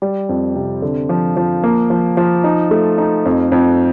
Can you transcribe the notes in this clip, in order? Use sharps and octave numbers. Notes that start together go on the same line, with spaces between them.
G3
F2
C3
D3
F3
F3
A#3
F3
F3
D#4
A3
D#4
F2
F2